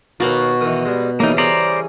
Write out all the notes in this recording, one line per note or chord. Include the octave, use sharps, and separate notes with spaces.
D#2 B2 A#3 B3 F#4
D#3 E3
G3 G#3
C#3 E3 G3 A#3 D#4
G#4 A#4 C5 D5 A#5 B5